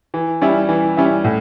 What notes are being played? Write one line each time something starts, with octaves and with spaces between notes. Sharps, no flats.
E3
G3 C#4 E4
E3
G3 C#4 E4
A2